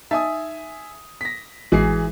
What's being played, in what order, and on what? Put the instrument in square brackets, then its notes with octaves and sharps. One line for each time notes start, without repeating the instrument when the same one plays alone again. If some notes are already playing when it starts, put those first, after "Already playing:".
[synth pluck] D#4 A5 A6 [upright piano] E5 G#5 D#6
[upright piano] A#6 B6
[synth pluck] A1 G#3 F#4 [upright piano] E3 G#4 C7